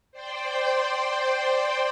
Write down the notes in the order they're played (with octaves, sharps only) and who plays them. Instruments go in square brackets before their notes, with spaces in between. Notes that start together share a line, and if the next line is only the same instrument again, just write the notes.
[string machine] C5 D5 G5 C6